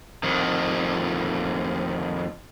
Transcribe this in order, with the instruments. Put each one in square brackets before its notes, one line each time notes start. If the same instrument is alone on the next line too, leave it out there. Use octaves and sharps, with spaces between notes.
[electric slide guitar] F2 D#3